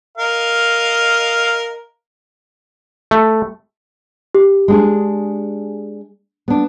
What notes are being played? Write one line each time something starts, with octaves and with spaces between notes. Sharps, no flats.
A#4 D#5 F5
A3
G4
G#3 D4 G#4
B3 D4